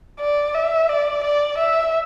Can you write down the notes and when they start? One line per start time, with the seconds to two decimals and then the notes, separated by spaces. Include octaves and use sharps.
0.20 D5
0.55 E5
0.89 D5
1.24 D5
1.58 E5